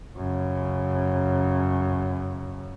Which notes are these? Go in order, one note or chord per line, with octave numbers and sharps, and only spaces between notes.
F#2 C#3